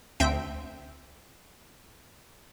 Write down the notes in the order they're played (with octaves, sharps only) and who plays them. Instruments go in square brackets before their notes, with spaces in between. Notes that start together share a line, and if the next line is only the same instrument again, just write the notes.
[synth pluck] D2 C4 E5 G5 B6 D7